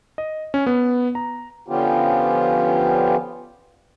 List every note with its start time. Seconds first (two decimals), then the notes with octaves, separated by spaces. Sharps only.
0.18 D#5
0.54 C#4
0.66 B3
1.15 A#5
1.68 D3 F3 B3 C#4 F4 G4